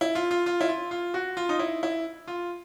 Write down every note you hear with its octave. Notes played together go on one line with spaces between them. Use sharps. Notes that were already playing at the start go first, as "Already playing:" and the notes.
E4
F4
F4
F4
E4
F4
F4
F#4
F4
D#4
E4
E4
F4